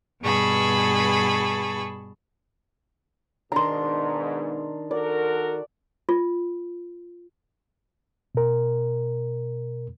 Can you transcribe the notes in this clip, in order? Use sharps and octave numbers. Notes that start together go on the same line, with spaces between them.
G2 B2 G#4 A5 B5 C#6
G#2 B2 D#3 D4 A#5 C6
F#4 A4 A#4 D5
F4
B2 A#4